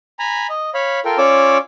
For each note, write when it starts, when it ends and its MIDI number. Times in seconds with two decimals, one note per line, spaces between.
0.19 0.47 80
0.19 0.47 82
0.19 0.47 83
0.50 0.70 75
0.74 1.00 73
0.74 1.00 77
0.74 1.00 83
1.05 1.18 65
1.05 1.18 69
1.05 1.18 70
1.05 1.18 79
1.18 1.58 61
1.18 1.58 65
1.18 1.58 73
1.18 1.58 74
1.18 1.58 86
1.18 1.58 88